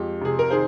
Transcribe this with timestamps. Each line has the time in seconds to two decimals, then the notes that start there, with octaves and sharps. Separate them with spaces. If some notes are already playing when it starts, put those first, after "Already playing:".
Already playing: F2 G#3 G4
0.21 C3 G#4
0.39 A#4
0.50 D#3 G#4 C5